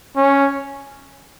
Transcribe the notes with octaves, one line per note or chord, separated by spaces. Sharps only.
C#4